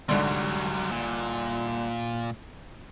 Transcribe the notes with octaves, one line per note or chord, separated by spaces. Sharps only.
C2 G#2 D3 F#3 G3
A#2